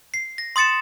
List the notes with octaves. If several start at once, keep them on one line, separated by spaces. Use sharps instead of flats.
C7
A#6
C6 D#6 A6 C#7 E7